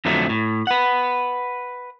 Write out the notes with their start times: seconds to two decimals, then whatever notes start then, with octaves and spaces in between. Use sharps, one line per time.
0.05 F2 D3 F3 F#3 A3 D#4
0.29 A2
0.67 B4 F#5